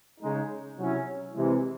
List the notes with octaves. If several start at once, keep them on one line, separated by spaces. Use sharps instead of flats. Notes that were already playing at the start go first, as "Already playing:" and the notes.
C#3 G#3 D#4
C3 F#3 C#4 E4
C3 E3 G#3